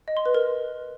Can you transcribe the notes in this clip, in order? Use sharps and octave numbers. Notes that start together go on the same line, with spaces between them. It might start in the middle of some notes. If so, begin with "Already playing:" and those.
D#5
C6
B4
A#4